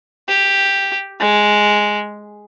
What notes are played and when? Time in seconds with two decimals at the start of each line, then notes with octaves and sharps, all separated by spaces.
0.29 G4
1.20 G#3